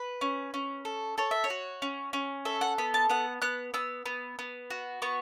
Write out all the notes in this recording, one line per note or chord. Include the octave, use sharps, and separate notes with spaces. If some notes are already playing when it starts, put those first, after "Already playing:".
Already playing: B4
C#4
C#4
A4
A4 C#5
E5
C#5
F#4
C#4
C#4
A4 E5
F#5
B3 B5
A5
B3 F#5
B3 F#6
B3 E6
B3
B3
F#4
B3 C#6